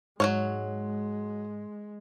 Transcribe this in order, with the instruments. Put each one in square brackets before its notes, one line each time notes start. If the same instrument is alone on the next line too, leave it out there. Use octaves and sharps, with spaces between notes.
[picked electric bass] G#2 [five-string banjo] F#3 A#3 C#5 [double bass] G#3